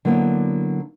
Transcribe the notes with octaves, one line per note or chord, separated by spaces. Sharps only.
D3 F#3 A#3 B3 D4 E4